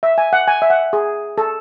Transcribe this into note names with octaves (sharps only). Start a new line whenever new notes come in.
E5
G#5
F#5
G#5
E5
F#5
G#4
A4